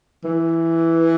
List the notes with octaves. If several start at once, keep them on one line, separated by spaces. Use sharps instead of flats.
E3